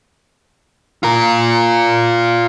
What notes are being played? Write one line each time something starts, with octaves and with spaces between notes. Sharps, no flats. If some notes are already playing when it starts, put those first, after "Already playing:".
F4 A#4